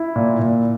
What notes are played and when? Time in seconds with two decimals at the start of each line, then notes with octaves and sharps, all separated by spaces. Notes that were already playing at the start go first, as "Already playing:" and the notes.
Already playing: E4
0.16 A#2
0.39 A#2